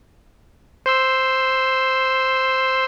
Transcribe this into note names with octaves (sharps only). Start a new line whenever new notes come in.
C5 C6 E6